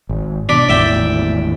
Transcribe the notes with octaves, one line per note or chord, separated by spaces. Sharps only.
G#1
B2 D4 B5 D6
G#1 E2 A2 D5 E5 G5